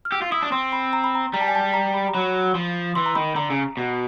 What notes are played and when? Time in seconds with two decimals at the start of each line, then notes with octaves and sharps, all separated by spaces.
0.05 F6
0.12 G4 E6
0.22 F4
0.32 E4 D#6
0.42 D4
0.52 C4 C6
0.72 B5
0.93 A#5
1.04 B5
1.15 A#5
1.34 G3 A#5
1.41 A5
1.48 G#5
1.55 A5
1.74 A#5
1.94 B5
2.08 A#5
2.14 F#3 B5
2.55 F3
2.95 E3 C6
3.06 A#5
3.15 D#3 B5
3.35 D3 A#5
3.50 C#3
3.77 B2